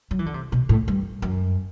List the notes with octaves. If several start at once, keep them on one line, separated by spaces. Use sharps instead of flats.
F#3
E3
D3
C3
B2
A2
G2
F#2